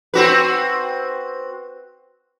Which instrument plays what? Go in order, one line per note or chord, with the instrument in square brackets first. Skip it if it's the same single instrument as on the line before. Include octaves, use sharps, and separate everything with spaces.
[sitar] C4 F#4 B4